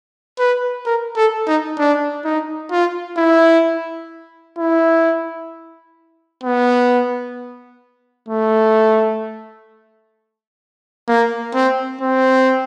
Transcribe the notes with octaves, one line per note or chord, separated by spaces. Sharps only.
B4
A#4
A4
D#4
D4
D#4
F4
E4
E4
B3
A3
A#3
C4
C4